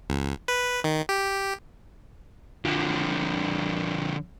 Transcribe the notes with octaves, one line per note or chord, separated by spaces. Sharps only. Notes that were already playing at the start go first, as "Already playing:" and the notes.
C#2
B4
D#3
G4
D3 F3